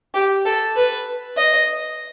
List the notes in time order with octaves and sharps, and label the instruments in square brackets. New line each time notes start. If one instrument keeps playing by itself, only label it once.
[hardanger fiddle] G4
A4
B4
D#5